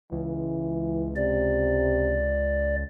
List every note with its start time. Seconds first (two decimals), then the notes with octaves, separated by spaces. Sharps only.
0.12 C#2 E3
1.16 C3 D5